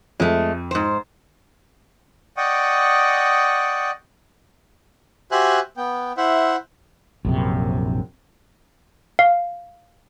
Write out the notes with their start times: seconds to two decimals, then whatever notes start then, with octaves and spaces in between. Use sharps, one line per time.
0.20 F2 G#3 A3
0.71 G#2 C5
2.37 D5 D#5 F#5 G5 C#6 D#6
5.32 F#4 G4 C5 E5 G#5 F#6
5.77 B3 G5
6.17 E4 C5 E5 F#5
7.25 A#1 F#2 C3
9.19 F5